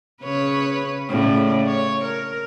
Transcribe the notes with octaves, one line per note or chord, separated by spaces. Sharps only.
C#3 B4 C#5
A2 C#3 D5
C#5
A#4